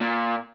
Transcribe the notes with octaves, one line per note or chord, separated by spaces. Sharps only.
A#2